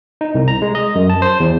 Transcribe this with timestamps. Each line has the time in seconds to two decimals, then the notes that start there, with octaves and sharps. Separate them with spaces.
0.21 D#4
0.35 C2
0.48 A#5
0.62 G#3
0.75 D#5
0.95 F#2
1.10 A5
1.22 C5
1.40 E2